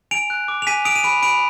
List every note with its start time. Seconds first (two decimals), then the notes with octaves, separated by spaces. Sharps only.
0.11 G#5 D7 F7
0.30 F#6
0.48 D6
0.62 F7
0.67 G#5 B6 D#7
0.85 D#6 D7 F7
0.96 D#7
1.04 B5 D7 F7
1.22 B5 D7 F7